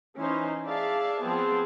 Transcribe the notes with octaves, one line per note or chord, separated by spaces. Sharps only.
E3 C#4 D#4 E4 C5
G#4 D5 E5 F5 A5
F3 B3 C4 G#4 A5